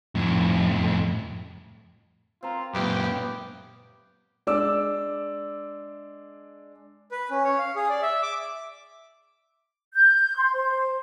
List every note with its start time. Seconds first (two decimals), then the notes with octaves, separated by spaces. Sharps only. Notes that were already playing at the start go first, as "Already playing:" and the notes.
0.15 F2 A2
2.43 C4 F4 A#4
2.74 F#2 A#2 B3 G4 E5 F5
4.47 G#3 D4 D6 E6
7.12 B4
7.31 C#4
7.44 C#5
7.58 F5
7.75 G#4
7.90 D5
8.02 E5
8.22 D6
9.94 G6
10.36 C6
10.54 C5